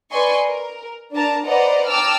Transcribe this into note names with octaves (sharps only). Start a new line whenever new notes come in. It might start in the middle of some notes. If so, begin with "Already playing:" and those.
B4 D5 D#5 G#5 C6 C#6
A#4
D4 A#4 A5 A#5
B4 C5 D5 D#5 F#5 A#5
G5 A5 A#5 D6 E6 F6